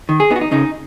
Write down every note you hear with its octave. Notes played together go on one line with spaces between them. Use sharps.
D#3
G#4
B3 D#4
F#4
D#4
C#3 D#4